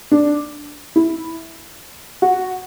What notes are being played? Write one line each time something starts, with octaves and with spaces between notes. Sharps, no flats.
D4
E4
F#4